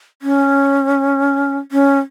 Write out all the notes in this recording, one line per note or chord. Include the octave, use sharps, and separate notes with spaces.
C#4
C#4